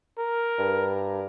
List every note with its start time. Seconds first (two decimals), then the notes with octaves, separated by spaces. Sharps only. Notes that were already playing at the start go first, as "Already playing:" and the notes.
0.18 A#4
0.58 G2